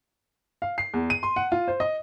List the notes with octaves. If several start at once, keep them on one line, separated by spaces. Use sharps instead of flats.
F5
C7
E2
D#7
C6
F#5
F4
C5
D#5